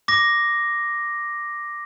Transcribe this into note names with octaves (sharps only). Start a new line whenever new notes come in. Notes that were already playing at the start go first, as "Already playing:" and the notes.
D6 A#6